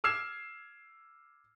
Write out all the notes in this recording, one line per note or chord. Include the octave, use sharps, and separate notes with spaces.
D6 E6 F6 G#6 C7 E7